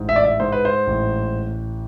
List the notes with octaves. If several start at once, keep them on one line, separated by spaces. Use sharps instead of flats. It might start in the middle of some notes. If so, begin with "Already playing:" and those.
Already playing: A1 G#2
E5
D5
E5
G#2 C5
B4
C5
A1